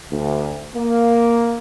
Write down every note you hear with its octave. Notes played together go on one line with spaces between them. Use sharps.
D2
A#3